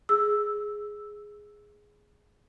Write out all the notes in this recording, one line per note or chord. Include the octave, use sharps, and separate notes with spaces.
G#4 E6